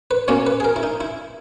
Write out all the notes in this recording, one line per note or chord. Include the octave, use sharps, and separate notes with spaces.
B4
B2 A#3 C#4 C#5
B4
G#4
A#4
E4
D#4
E4